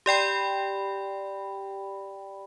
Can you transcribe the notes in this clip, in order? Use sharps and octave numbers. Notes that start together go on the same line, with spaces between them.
G4 D5 G5 B5